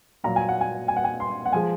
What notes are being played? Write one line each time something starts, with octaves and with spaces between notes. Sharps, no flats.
A#2 F#3 A#3 A#5
G#5
F#5
G#5
G#5
F#5
G#5
C6
F#5
F3 G#3 G#5